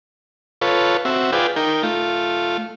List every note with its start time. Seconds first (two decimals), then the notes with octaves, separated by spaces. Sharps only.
0.62 F4 A4 B4 C#5
1.05 C4 F#4 E5
1.33 F4 G#4 B4 D5 G5
1.56 D#4 A#4 G5
1.83 A3 F4